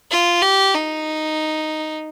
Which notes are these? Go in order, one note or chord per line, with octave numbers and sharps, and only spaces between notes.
F4
G4
D#4